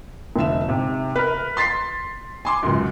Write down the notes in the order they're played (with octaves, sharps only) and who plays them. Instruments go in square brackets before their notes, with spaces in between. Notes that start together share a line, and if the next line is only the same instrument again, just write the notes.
[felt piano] F1 D3 E5 E7
G#2 C3
A#4 B4
C6 A6 B6 C7
G#5 C6 D6
C#2 F#2